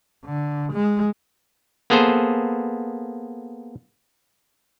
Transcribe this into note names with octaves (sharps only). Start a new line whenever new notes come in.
D3
G#3
A#3 B3 G#4 A4 C5